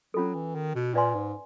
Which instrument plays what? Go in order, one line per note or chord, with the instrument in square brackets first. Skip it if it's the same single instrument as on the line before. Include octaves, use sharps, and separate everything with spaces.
[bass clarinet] F#3 [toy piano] C#4 F4 A4
[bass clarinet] E3
D#3
B2
[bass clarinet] A#2 [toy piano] B4 D5 F5 G#5 C6
[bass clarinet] G#2